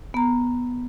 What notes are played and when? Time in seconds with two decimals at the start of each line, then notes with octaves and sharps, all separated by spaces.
0.14 B3 A#5